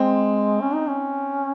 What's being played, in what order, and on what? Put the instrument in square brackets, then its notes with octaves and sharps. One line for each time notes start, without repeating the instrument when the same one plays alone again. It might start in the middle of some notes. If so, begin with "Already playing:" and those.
Already playing: [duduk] G#3 [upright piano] C4
[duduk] C#4
D#4
C#4